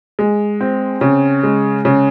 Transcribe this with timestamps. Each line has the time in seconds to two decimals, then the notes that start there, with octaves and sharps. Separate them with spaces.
0.19 G#3
0.61 C4
1.01 C#3
1.43 G#3
1.85 C#3